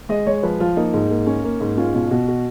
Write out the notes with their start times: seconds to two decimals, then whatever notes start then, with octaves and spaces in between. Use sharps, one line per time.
0.09 G#3 D#5
0.27 G#3 C#5
0.43 F3 B4
0.60 F3 F4
0.76 A#3 D#4
0.94 G#2
1.10 A#3
1.27 C#4
1.44 A#3
1.61 G#2
1.77 C#4 F4
1.94 B2 F4
2.11 B2 F#4
2.28 F#4